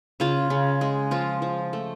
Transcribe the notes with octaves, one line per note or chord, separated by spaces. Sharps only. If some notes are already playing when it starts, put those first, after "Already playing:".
C#3 F4
C#3
G#3
F3 F4
F3
A3